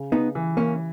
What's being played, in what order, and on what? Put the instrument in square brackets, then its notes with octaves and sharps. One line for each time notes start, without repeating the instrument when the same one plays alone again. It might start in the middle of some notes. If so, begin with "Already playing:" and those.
Already playing: [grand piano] C#3
[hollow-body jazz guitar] B3 D#4
[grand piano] E3
[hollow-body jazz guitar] A#3 C#4